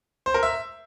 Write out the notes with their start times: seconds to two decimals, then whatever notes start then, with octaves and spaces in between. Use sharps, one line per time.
0.26 C5
0.34 A#4
0.43 E5